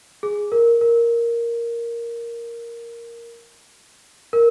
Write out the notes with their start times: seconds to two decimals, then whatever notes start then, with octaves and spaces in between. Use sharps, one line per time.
0.23 G#4
0.52 A#4
0.81 A#4
4.33 A#4